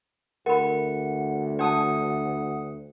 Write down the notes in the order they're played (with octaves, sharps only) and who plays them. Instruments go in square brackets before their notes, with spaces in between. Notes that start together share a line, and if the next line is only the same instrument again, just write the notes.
[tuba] D2 [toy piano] A#4 B5 [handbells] F#5
[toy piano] D4 A5 [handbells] F#5 D#6